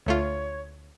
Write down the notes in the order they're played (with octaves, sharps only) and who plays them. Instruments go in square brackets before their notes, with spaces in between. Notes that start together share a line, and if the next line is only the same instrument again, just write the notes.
[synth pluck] D2 A3 F4 [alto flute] C#5